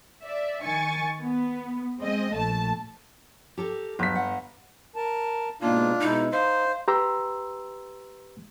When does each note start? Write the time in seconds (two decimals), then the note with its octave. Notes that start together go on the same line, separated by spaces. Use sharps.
0.23 D5 E5
0.63 D#3 G#5 C#6 A6
1.22 B3
2.02 G#3 C4 D#5
2.34 A#1 A3 A5
3.57 G4 A4 A#4
3.99 G1 F#3 B6
4.15 F#5
4.96 A#4 A5
5.62 G#2 B2 A#3 D4 D#4 F4
6.01 B2 G#3 D#4 E4
6.32 D#4 C5 F5
6.88 G4 B4 G5 A#5 C6 E6